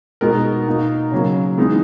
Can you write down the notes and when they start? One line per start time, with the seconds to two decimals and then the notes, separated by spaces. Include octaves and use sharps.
0.21 B2 G#3 B3 D#4 A#4
0.67 B2 A#3 D#4
1.12 C#3 F#3 A#3
1.58 E3 G#3 B3 D#4